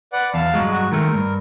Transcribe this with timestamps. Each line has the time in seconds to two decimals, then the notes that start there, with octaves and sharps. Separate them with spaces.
0.13 B4 D5 F#5
0.34 E2 F5 A5 F6
0.54 G2 F#3 G#3
0.70 F#4
0.92 D#3 G#3 A3 A#4
1.14 G2